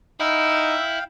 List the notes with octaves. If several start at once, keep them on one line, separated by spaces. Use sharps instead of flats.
D#4 E4 F5 G5 E6